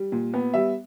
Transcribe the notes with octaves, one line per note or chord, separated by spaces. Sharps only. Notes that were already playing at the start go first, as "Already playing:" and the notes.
Already playing: G3
A#2
B3
G3 E5